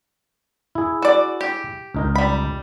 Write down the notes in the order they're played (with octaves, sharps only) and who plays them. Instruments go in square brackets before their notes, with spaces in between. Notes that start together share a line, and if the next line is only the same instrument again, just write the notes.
[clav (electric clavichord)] E4 G#4
[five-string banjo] F#4 D5
G4
[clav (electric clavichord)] C#2 D#4 A#4
[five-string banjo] G3 B5